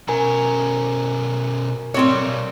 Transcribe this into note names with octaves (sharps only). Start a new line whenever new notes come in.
B2 C#4 A#4 G#5 A#5
A2 G3 C4 C#5
B1